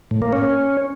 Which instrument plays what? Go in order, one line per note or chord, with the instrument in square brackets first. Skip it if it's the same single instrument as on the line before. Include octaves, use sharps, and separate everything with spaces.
[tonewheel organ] A2
A#3
C#4